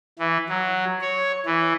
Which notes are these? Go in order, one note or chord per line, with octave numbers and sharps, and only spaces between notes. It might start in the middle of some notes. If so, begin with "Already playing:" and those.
E3
F#3
C#5
E3